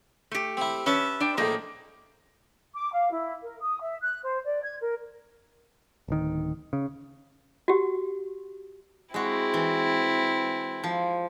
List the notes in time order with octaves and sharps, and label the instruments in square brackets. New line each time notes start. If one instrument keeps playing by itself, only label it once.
[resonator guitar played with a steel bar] A3 G4
[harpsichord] C4 E4
[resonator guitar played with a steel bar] C#4 [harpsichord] B4 E5 A5
[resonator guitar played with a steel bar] D4 G5
[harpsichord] A2 D#4 [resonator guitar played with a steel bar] F3 A#3 G#4
[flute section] D6
F5
E4
A#4
D#6
E5
F#6
C5
D5
G#6
A#4
[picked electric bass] D1 D#3
C#3
[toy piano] F#4 G4
[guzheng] G#3 F#4 [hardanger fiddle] C4 E4
[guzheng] E3
F3